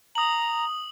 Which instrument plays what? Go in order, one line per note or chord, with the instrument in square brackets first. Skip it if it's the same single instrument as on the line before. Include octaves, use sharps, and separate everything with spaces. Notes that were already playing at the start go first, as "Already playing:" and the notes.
[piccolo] A#5 [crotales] D#6 F#7